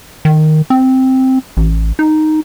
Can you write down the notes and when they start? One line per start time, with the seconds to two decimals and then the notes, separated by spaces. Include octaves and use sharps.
0.25 D#3
0.70 C4
1.57 A1
1.99 D#4